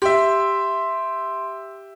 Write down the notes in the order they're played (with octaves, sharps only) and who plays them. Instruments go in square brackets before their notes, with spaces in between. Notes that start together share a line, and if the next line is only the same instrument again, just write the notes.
[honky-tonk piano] G4 E5 [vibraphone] C6